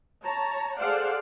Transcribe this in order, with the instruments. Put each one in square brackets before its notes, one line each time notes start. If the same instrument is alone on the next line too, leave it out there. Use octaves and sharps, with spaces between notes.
[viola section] C#5 A5 A#5
G#4 A4 C5 D5 F5 F#5